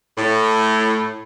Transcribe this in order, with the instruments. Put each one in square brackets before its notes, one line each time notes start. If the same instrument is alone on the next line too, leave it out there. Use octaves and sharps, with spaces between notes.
[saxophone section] A2